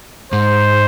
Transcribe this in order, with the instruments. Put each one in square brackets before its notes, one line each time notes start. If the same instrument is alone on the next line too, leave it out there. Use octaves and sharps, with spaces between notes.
[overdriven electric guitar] G#2 [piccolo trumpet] C5